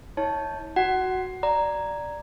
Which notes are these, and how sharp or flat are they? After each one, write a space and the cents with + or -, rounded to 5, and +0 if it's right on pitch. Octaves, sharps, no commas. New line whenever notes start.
E4 -45 C#5 +0 A5 +0
F#4 +0 F#5 +20
D5 +5 A#5 +0